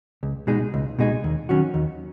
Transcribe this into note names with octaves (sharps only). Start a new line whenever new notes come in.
C#2
B2 G#3 D#4 G#4
C#2
B2 G#3 D#4 G#4
D#2
D#3 F#3 C#4 F#4
D#2